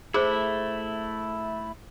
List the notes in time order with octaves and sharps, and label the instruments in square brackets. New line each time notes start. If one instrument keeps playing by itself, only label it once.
[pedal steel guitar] A3 E4 [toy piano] G#4 C5